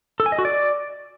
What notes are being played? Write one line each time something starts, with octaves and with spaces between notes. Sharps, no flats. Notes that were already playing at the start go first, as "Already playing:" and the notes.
A4
G#5
D#5
F#4
D5